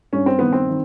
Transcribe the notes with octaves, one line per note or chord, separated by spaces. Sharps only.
G2 C#4
C4
D#3 B3
C4
D#3